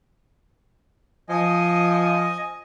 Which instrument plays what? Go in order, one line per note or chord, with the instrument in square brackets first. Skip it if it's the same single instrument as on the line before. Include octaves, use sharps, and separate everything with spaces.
[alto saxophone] F3 [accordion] D#5 G#5